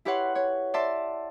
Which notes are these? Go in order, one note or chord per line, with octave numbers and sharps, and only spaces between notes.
E4 G4 B4 C#5 F#5 C6
C#5
D5 E5 A5 C6